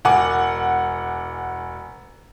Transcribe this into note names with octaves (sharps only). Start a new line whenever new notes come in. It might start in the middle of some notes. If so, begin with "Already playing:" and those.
E1 F#5 G#5 D6